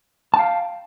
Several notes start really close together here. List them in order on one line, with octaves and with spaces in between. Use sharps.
A5 G5 F5